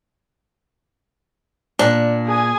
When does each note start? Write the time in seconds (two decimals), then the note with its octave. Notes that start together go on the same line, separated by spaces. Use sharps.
1.79 A#2 D4
2.26 G#4 G#5